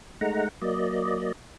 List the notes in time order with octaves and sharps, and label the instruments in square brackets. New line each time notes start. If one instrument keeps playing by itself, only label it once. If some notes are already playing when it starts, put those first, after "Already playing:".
[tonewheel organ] G#3 A3 D#4 F#5 A#5
F#3 A#3 D5 D#5